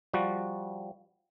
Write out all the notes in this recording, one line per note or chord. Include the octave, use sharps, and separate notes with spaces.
F3 G3 F#4